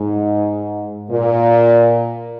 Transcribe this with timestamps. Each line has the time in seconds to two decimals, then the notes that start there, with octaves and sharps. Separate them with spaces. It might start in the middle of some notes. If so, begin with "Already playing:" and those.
Already playing: G#2
1.10 A#2